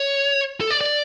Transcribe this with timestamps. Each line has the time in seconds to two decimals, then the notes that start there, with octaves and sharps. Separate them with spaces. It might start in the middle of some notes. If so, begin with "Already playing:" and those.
Already playing: C#5
0.61 A4
0.70 D5
0.81 D5